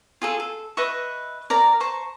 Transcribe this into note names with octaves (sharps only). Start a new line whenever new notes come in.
F4 G#4 A4
A4
B4 D#5 E5 C#6
A#4 D5 A#5
C5 A5 A#5 C#6